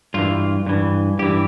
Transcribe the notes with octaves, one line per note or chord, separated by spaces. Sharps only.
G2 E3 F4
G2 E3
G2 E3 G4